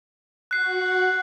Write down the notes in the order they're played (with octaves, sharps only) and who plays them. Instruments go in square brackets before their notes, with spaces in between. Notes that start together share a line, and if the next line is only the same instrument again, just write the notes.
[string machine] F#4 F#5 [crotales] F#6 C7